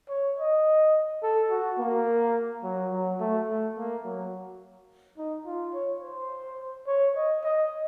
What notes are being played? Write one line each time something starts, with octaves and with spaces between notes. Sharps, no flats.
C#5
D#5
A4
F#4
A#3
F#3
F#3
A3
A3
A#3
F#3
D#4
F4
C#5
C5
C#5
D#5
D#5